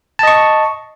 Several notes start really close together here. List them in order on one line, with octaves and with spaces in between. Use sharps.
A5 D#5 C#6